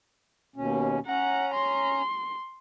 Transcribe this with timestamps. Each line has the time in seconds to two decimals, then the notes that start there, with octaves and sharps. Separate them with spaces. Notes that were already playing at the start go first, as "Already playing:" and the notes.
0.56 D#2 B2 C#4
1.07 C#4 F#5 A#5
1.54 C6